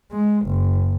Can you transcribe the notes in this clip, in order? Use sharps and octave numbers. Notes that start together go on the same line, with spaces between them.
G#3
F#1